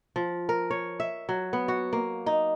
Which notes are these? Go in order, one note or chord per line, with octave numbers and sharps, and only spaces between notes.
F3
A#4
C#5
E5
F#3
B3
F#4
A#3
D#4